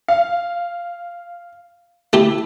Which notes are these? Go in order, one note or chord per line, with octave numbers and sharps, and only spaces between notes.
F5
A3 E4 G4